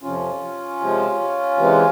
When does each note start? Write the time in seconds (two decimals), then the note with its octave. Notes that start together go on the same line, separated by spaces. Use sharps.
0.03 F2 C3 F3 C#4 F4
0.81 C3 F3 G#3
1.57 C3 E3 G#3